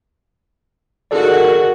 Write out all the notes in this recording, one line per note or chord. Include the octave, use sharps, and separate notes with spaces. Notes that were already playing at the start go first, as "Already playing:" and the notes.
D#3 F#4 G#4 A4 D5